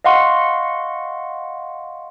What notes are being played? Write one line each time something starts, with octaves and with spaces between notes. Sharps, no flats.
D#5 F5 F#5 C6 C#6